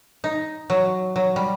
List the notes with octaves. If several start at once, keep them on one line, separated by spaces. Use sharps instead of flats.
D#4
F#3
F#3
G3